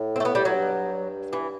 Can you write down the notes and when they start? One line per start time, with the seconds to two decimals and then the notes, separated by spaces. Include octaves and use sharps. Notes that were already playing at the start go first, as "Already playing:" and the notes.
Already playing: A2
0.16 C4
0.20 A3
0.25 B3
0.35 G3
0.45 F#3
0.54 G2
1.33 E3